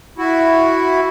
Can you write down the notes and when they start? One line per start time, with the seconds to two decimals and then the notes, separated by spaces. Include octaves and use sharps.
0.18 E4 F#4